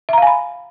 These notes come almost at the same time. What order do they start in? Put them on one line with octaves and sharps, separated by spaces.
E5 A#5 F5 G#5 B5